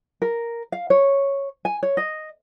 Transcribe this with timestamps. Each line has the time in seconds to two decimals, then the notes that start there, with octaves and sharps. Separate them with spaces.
0.22 A#4
0.72 F5
0.90 C#5
1.65 G#5
1.83 C#5
1.97 D#5